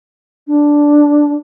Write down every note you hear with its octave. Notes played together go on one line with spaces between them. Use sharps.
D4